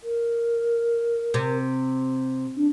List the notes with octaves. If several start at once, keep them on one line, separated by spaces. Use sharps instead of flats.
A#4
C3
D4